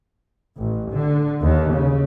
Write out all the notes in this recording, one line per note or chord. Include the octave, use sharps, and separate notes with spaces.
A1
D3
D#2
C#3